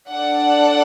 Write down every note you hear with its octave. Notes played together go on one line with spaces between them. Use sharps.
D4 A4 D5 F#5